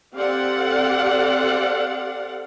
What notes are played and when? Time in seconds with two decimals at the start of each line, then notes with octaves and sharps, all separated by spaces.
0.15 C4 G4 A4 D5 F5 F#5